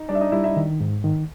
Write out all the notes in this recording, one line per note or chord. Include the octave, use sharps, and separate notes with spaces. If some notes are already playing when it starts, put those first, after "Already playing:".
Already playing: D#4
G3 D4 D5
E5
D#4 D#5
G3 E4 E5
E4 E5
D#3
G#2
D#3